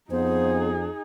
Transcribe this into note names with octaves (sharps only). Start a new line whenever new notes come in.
F2 B3 D#4 G#4 C5